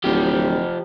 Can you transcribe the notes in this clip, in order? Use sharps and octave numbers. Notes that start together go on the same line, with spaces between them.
D1 F3 G4